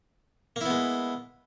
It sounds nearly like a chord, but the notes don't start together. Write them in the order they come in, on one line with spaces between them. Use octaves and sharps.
A#3 E4 B3 G#3